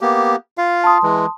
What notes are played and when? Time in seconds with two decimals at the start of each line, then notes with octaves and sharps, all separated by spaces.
0.01 A#3 B3 G4
0.58 F4 F5
0.84 A5 C6 D#6
1.03 E3 G#3